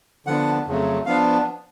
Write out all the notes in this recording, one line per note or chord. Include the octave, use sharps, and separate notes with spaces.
D3 F3 B3 D4 F#5
F2 C#3 F#3 A3
F3 B3 D4 F5